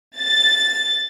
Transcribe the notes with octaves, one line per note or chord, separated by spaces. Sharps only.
A6